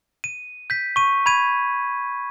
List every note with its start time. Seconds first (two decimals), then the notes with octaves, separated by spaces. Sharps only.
0.24 D#7
0.70 G6 B6
0.96 C#6 D#7
1.26 B5 G#6 D#7